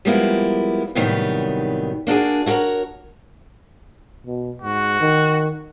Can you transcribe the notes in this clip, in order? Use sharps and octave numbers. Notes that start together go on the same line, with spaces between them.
F3 G3 G#3 A#3 B3 E4
A2 C3 D#3 F#3 G3 B3
A#3 D4 F#4 G#4
E4 F#4 G4 A#4 C#5
B2
G#2 F#4
D#3